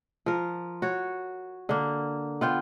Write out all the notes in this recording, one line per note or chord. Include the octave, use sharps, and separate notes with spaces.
F3 A#4
F#4 C#5
D3 A#3
B3 F4 G5